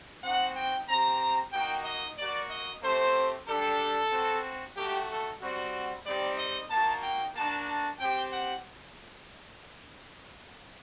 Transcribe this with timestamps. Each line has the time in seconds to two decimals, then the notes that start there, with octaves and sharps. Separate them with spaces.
0.23 C4 D#4 F#4 F#5
0.56 G5
0.88 C4 G4 A#5
1.53 A#3 D#4 F#4 G5
1.85 D#5
2.18 A#3 F#4 D5
2.50 D#5
2.82 A3 C4 G4 C5
3.47 G3 D4 G4 A4
4.12 C4 F#4
4.76 A3 D#4 F#4 G4
5.10 A4
5.42 G3 C4 F#4
6.06 G3 C4 D#4 G4 D5
6.38 D#5
6.71 A#3 D#4 F#4 A5
7.04 G5
7.36 A#3 D4 F#4 A5
7.68 A5
8.00 C4 G4 G5
8.33 F#5